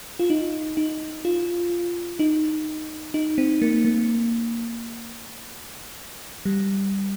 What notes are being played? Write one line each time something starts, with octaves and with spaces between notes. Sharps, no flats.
F4
D#4
D#4
F4
D#4
D#4
C4
A#3
A#3
G3